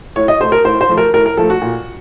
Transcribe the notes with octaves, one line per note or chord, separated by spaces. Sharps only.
A2 C#5
D#5
A3 C5
A#4
A2 C5
C5
F3 A3
A#4
A2 A#4
A#4
F3 A3 A4
F#4
A#2